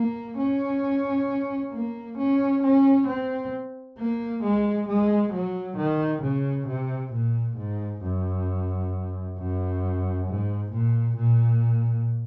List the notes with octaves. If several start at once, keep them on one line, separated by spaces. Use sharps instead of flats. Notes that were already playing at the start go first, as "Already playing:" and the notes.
Already playing: A#3
C#4
A#3
C#4
C#4
C4
A#3
G#3
G#3
F#3
D#3
C#3
C3
A#2
G#2
F#2
F#2
G#2
A#2
A#2